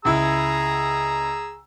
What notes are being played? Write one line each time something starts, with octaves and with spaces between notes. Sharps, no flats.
C#2 E4 G#4 A#5 E6